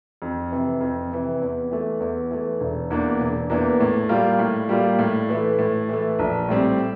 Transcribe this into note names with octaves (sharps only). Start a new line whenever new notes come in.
F2
C3 E3
F2
C3 E3
E2
E3 A3
E2
E3 A3
E1
E2 E3 A#3 D4
E1
E2 E3 A#3 D4
A2
G3 A#3 F4
A2
G3 A#3 F4
A2
E3 A3
A2
E3 A3
A#1
A2 G3 C4